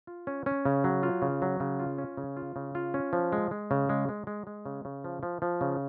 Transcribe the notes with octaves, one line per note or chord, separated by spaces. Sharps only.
F4
C#4
C#4
C#3
F#3
F4
C#3
F#3
C#3
F4
C#4
C#3
F4
C#3
F4
C#4
F3
G#3
G#3
C#3
G#3
G#3
G#3
G#3
C#3
C#3
F3
F3
F3
C#3